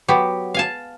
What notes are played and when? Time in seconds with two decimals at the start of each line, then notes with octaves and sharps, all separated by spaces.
0.08 F#3 B3 G4
0.54 F5 G#5 A5